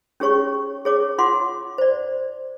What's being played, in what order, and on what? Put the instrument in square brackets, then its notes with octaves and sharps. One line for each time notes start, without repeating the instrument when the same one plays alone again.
[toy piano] C#4 G4 G#4 C#5 C#6
G#4 C#5 D6
F4 F#5 C6 D6
C5 D5